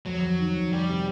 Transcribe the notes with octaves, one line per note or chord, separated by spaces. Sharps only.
F2 F#3
F2
D#3
F2
F2 G3
C3